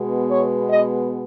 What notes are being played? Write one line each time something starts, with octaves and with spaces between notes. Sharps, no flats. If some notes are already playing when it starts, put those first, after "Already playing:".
Already playing: B2 G#3 B3
C#5
D#5